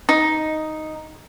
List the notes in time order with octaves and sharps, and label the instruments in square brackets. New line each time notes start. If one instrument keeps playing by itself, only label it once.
[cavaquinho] D#4